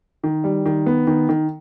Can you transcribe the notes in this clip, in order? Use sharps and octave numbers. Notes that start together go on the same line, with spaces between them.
D#3
G3
D#3
B3
D#3
D#3